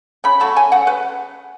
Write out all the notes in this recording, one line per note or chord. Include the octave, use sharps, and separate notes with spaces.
C#3 B5
F#3 A3 A5
C#3 G#5
F#3 A3 F#5
C#3 B4